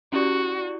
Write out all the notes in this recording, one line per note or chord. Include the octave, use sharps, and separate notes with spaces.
C#4 E4 F#4 G4 D5